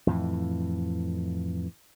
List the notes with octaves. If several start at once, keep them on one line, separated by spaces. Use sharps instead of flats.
F2 A2 E3